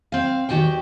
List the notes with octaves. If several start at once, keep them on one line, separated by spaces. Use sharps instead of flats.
C4 F5
E2 D#3 A3 F#4 G4 G5